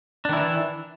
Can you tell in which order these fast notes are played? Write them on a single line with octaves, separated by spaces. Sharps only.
D4 D#3 E4 E3